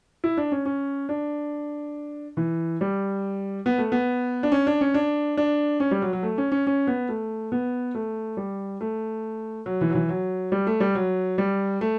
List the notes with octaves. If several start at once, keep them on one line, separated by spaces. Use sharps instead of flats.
E4
D4
C#4
C#4
D4
E3
G3
B3
A3
B3
D4
C#4
D4
C#4
D4
D4
C#4
G3
F#3
F#3
A3
C#4
C#4
C#4
B3
A3
B3
A3
G3
A3
F#3
E3
F#3
E3
F#3
G3
A3
G3
F#3
G3
A3